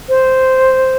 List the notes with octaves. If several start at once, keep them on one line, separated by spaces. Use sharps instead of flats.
C5